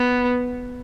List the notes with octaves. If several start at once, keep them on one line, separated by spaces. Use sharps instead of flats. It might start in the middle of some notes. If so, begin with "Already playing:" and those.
Already playing: B3